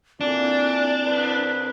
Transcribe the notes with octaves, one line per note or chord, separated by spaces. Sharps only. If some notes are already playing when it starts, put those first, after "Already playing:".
A#2 E3 C4 D4 E4 A4 D5
C2 B4